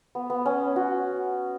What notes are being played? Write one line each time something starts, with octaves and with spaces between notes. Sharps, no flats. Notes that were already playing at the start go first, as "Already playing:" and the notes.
B3
B3
C#4
F#4